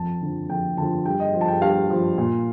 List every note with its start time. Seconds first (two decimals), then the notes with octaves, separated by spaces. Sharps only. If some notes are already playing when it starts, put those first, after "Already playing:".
Already playing: F2 A5
0.22 D3 F3
0.49 F2 G5
0.77 D3 F3 A5
1.06 G2 G5
1.20 D#5
1.33 F3
1.41 A5
1.48 G5
1.61 G2 F5
1.90 F3
2.18 A#2